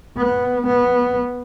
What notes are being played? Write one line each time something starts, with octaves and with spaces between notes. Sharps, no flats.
B3
B3